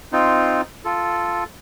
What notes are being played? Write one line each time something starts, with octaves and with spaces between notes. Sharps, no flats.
C4 D#4 F4
F4 A4